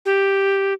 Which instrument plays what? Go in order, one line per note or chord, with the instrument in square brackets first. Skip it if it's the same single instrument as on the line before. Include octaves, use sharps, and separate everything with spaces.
[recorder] G4